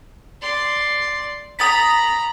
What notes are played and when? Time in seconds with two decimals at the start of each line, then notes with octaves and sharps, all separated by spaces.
0.41 D5 C6
1.59 A#5 B5 D#6 A6 B6